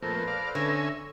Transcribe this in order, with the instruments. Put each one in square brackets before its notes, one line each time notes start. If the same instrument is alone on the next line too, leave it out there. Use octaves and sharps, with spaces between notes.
[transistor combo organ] F2 A#2 A3 [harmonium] A4 B4 C5 [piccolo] A#6
[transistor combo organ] D5 F5
[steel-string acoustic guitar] D3 [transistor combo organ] C#4 E5 G#5